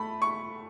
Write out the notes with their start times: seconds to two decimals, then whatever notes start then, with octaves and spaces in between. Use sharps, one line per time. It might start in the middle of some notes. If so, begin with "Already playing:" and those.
Already playing: A3 B5
0.22 C#6